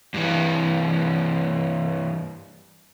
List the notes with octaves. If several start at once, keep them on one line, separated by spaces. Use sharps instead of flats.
G2 E3